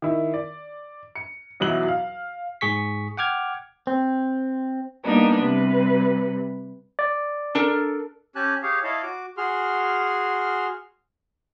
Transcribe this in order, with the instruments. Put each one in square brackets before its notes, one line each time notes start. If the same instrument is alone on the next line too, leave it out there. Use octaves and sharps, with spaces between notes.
[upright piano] D#3 E4
D5
C#7
B1 E2 F#3 E4 F#7
F5
[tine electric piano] G#2 G#4 C#6 B6
F#5 G5 D6 F6 G#6
[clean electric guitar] C4
[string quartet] G3 A#3 B3 D4 D#4
C3 G3 B4
[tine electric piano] D5
[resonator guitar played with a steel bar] D4 A4 A#4
[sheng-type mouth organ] C#4 G4 G#5 A5 F#6
G4 G#4 C#5 F5
E4 C#5 D#5 F5 A5
F#4 D6
F#4 G#4 C6 F6